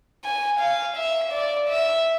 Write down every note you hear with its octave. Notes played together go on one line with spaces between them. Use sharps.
G#5
F5
E5
D5
E5